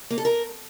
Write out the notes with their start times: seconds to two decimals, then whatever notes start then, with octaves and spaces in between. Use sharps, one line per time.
0.10 A#3
0.18 A4
0.25 A#4